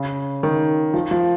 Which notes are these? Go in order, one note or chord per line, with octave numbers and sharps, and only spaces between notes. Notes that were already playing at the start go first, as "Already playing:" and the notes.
Already playing: C#3
D#3
F3
F3